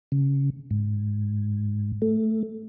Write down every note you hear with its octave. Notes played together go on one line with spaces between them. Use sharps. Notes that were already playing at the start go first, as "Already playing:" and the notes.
C#3
G#2
A3